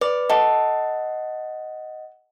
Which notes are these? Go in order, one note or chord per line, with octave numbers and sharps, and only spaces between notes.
B4 D5
A4 D#5 F#5